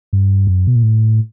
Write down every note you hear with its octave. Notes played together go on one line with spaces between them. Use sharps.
G2
F#2
B2
A#2
A2